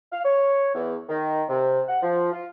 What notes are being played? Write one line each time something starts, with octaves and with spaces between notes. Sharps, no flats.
F5
C#5
E2
D#3
C3
F#5
F3
F4